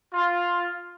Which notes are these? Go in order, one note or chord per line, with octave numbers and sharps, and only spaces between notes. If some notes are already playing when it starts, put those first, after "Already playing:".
F4